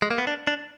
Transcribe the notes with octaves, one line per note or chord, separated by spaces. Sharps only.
G#3
A#3
B3
D4
D4